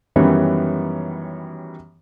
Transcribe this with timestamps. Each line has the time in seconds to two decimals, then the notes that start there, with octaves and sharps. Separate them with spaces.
0.16 F#2 D#3 E3 G3 B3 C#4